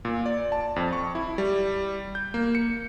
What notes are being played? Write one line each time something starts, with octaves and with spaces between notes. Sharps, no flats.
A#2
D5
A5
F2
C#6
E4
G3
G6
A#3
C#7